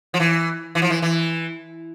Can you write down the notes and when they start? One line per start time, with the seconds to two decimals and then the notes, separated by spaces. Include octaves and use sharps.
0.14 F3
0.20 E3
0.75 E3
0.82 F3
0.90 E3
1.02 E3